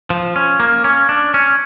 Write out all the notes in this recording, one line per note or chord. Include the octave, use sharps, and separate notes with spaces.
F3
C#4
A#3
C#4
D4
C#4